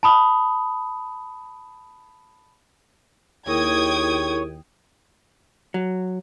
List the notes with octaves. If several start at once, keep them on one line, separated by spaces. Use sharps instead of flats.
A5 B5 D#6
D#2 E4 G#4 A#4 C#5 G5 D#6 G#6
F#3